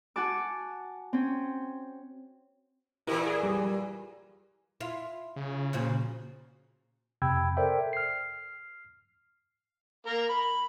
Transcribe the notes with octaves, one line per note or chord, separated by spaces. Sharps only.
F#4 G#5 A5 D6
C4 C#4
A#2 E3 E4 G4 A#4 B4
G#4
G3
E4 F4
C#3
A#2 F3 F#4
F2 C3 G5 B5 E6 G#6
A4 A#4 C5 D5 E5 G5
F6 C7
A#3 A#4 A#5
B5